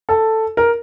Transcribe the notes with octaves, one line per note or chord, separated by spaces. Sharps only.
A4
A#4